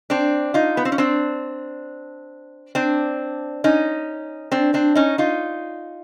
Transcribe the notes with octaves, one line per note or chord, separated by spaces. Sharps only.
C4 D4
D#4 F4
B3
C4
C#4
C4 D4
C4 D4
C#4 D#4
C4 D4
C4 D4
C#4 D#4
D#4 F4